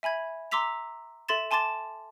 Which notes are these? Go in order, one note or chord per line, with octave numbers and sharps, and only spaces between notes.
E5 G#5 B5 G#6
A#5 C6 D6 E6 B6 F7
A4 E5 C6 A6 E7
G#5 A5 C6 D6 A6 E7